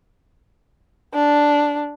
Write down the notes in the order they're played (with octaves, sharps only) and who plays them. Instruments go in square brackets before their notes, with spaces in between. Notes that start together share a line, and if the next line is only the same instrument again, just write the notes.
[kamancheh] D4